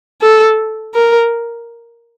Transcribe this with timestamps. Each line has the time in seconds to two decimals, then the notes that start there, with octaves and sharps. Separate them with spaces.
0.21 A4
0.94 A#4